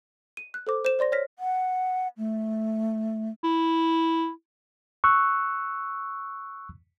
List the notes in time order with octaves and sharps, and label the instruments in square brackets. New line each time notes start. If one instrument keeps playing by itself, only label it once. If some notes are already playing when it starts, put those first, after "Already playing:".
[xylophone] D#7
F#6
A4 C5 D6
C5 E7
C5 D5 C6 A#6
C#5 F6 A#6 B6
[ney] F#5
A3
[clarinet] E4
[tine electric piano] C#6 E6 F#6